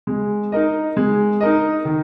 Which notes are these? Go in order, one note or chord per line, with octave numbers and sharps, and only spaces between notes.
G#3
D#4 A#4 D#5
G#3
D#4 A#4 D#5
D#3